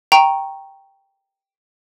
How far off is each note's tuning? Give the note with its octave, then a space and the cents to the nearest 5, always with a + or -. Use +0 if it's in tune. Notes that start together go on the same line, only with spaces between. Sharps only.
G5 +0 A#5 +0 C#6 -10